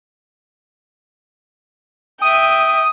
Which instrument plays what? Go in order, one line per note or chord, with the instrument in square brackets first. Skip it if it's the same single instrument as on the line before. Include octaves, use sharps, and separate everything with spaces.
[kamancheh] E5 G5 [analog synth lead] D#6